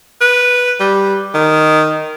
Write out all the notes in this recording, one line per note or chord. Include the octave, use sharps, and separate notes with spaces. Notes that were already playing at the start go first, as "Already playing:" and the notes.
B4
G3
D#3